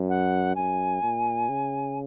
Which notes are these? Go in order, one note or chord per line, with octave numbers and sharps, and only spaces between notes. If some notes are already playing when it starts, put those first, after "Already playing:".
Already playing: F#2
F#5
F#2 G#5
A#2
C#3